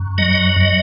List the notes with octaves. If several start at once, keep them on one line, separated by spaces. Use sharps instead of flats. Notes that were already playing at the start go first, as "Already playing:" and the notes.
Already playing: F#2
F#3 D#5
D#5